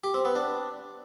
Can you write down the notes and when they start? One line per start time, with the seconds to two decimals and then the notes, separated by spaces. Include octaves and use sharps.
0.04 G4
0.14 C4
0.25 B3
0.35 D4